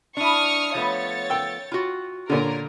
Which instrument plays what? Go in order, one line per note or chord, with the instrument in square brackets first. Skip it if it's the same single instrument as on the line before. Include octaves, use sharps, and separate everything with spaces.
[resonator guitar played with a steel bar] D4 E4 [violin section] C#6 D#6 F6
[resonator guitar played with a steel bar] F3 A3 B3 [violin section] C#5 A6
[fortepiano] G5 E6
[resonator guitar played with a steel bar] F4 F#4
[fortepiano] A#2 D3 [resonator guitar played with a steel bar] F4 C#5 [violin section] A#4